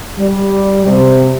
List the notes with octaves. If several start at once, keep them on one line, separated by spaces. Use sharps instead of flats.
G3
C3